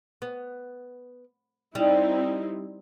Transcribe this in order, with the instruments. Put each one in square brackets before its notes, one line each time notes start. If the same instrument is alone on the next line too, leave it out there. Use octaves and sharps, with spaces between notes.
[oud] B3
[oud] G3 [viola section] C4 D#4 E4